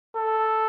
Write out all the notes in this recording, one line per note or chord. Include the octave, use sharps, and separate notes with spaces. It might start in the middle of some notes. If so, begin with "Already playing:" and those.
A4